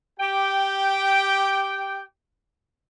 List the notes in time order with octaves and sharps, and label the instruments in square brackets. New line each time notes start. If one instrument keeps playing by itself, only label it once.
[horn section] G4 G5